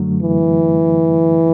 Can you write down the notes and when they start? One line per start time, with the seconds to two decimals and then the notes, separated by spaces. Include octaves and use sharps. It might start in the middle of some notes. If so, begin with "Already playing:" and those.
Already playing: F#2 D3 F#3 A3
0.22 E3